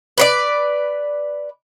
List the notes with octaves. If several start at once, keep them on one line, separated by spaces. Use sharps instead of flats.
B4 C5 D5